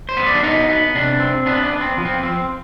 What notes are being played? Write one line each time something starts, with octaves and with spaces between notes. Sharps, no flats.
C5
B3
D5
D4
B3 D#4
B3
C3 D4
C4
B3 D4
D4
B3
C4
F3
C4
C4